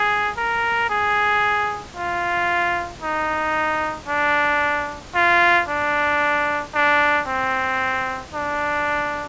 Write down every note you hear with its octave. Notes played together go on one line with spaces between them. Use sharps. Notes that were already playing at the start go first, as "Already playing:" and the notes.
Already playing: G#4
A#4
G#4
F4
D#4
D4
F4
D4
D4
C4
D4